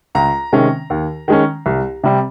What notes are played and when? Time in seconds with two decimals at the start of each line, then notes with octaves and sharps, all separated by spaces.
0.15 C#2 A#5
0.53 C3 D#3 G#3 C#4
0.90 D#2
1.28 D#3 G#3 C#4
1.66 C2
2.04 C3 G3